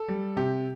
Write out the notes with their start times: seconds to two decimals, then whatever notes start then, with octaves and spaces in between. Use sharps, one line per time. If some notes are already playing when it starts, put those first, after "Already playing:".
Already playing: A4
0.08 G3
0.36 C3 G4